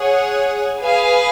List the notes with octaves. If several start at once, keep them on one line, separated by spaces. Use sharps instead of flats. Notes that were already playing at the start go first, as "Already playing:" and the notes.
Already playing: G#4 C#5 F#5
G#4 B4 F5 G#5